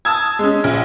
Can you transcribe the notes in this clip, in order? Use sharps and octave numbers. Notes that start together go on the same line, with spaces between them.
A5 D#6 E6 G#6
G#3 C#4
A#1